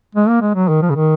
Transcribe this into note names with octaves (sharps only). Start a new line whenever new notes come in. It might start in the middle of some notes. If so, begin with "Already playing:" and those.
G#3
A#3
G#3
F#3
D#3
F3
C#3
D#3